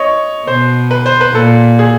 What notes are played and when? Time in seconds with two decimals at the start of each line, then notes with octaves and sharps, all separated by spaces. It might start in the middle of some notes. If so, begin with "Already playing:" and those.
Already playing: C#5 D#5
0.47 B2 C5
0.91 B4
1.06 C5
1.21 B4
1.35 A#2 A4
1.79 G#4